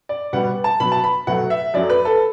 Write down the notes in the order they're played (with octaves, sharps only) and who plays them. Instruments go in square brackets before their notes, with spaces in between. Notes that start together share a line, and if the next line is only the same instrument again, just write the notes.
[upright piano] D5
B2 G3 B3 F#5
A5
B2 F#3 B3 B5
A5
B5
B2 F#3 A3 F#5
E5
F#2 F#3 A3 D5
B4
A4